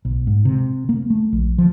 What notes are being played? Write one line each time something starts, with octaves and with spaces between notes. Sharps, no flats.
B1
G#2
C3
A#3
A3
A#1
F3